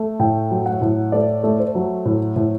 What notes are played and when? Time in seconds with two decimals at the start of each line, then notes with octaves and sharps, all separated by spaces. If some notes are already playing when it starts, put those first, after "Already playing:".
Already playing: A3
0.19 A2 G5
0.51 F#3
0.66 F#5
0.81 A2
1.12 A3 D5
1.43 A3
1.59 C5
1.75 F#3
2.05 A2
2.36 A2